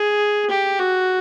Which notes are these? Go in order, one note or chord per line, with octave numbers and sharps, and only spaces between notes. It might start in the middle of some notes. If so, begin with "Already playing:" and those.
Already playing: G#4
G4
F#4